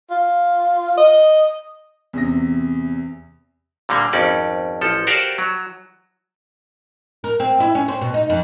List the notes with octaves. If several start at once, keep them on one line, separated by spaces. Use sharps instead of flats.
F4
D#5
E2 C3 A#6
A#2 D3 G3 A#3
G#1 F2 C#4 D#4 D5
A1 F3 A4
F#4 G4 A#4 C5 D5 F5
F#3
A#4
C4
E4
C#4
C4
B2
D#4
F2